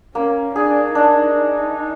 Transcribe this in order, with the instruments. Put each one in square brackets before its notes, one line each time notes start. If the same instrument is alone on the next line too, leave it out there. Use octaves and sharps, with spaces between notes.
[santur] A#3 [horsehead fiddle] C#4
[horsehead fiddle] D4 [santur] G#4
[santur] D4 [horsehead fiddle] D#4